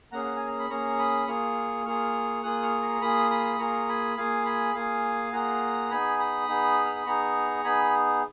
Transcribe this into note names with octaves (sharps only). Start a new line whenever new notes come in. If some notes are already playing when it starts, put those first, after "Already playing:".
A#3 C#4 G#4 F#5 A#5
F#5
G#5
A#5
B5
A#3 C#4 G#4 A#5 C#6
B5 D#6
A#3 F4 G#4 C#6 F6
A#3 F4 G#4 C#6 F6
A#3 F4 G#4 D#6 F#6
C#6 F6
A#5 C#6
A#3 F4 G#4 B5 D#6
B5 D#6
A#3 F4 G#4 A#5 C#6
G#5 B5
A#3 F4 G#4 F5 G#5
G#5 B5
A#3 F4 G#4 F5 G#5
A#3 F4 G#4 F#5 A#5
B3 D#4 G#4 G#5 B5
B5 D#6
B3 D#4 G#4
F6
D#6
B3 D#4 G#4 A#5 C#6
B3 D#4 G#4 G#5 B5